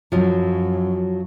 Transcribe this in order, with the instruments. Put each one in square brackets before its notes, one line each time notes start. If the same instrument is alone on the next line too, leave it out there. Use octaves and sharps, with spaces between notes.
[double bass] F#2 [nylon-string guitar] F3 F#3